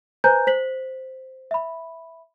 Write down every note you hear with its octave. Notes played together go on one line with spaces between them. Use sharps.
B4 C5 G#5 A#5 G6
C5 B6 F#7
E5 B5